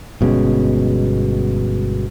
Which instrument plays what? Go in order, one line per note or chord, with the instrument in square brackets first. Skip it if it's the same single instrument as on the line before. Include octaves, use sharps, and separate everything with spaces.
[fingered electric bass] G1 B2 G#3 C#4